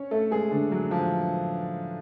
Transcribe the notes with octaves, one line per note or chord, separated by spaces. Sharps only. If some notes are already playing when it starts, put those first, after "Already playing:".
Already playing: C#4 C#5
A3 A4
G#3 G#4
D3 D4
F#3
F3